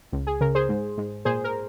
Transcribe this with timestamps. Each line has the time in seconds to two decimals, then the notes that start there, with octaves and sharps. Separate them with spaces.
0.12 C#2
0.27 G#4
0.41 C#3 A#4
0.55 G#4 C5
0.69 G#2
0.98 G#2
1.25 A#2 G#4 C5
1.44 A#4